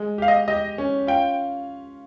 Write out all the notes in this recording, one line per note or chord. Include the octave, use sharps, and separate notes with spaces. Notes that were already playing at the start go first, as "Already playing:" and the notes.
Already playing: G#3
G4 F5
D#5
G4 D#5
C#4
F4 G5